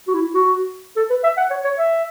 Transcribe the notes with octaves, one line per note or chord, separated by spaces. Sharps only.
F#4
E4
F#4
A4
B4
E5
F#5
C#5
C#5
E5